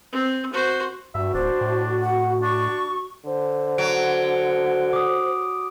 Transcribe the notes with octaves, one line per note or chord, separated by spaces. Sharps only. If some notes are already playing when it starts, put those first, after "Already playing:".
C4
F#4 C5
G2 F#4 E5
D1 D4 C5
A2
F#5
D4 C#6
D3 C5
F#3 D7
D6 D#6